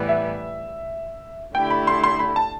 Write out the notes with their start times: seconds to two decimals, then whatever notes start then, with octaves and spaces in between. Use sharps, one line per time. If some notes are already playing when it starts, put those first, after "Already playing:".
Already playing: A2 E3 G3 B3
0.09 E5
1.55 D3 A3 E4 G4 G5
1.70 B5
1.87 C6
2.04 C6
2.19 B5
2.36 A5